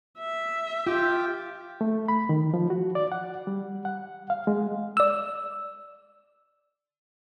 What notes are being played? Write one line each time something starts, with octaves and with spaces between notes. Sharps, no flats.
E5
F4 G4 G5
A3
B5
D#3
F3
F#4
D5
F#5
G3
F#5
F5
G#3
D5 E6